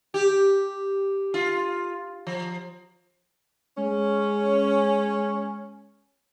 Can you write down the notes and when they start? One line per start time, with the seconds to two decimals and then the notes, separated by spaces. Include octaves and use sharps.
0.14 G4
1.34 F4
2.27 F3
3.78 G#3 C#4